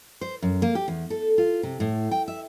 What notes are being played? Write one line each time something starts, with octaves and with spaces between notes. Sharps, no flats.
C5
F#2
A#3
G4
E2
A4
F4
C3
A2
G5
E5